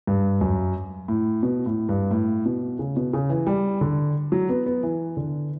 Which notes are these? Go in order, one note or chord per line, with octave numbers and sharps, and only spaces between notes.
G2
F#2
A2
B2
A2
G2
A2
B2
C#3
B2
C#3
E3
G3
D3
F#3
B3
B3
E3
D3